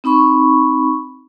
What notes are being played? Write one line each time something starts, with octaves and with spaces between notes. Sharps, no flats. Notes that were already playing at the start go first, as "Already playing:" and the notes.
C4 D#4 B5 C#6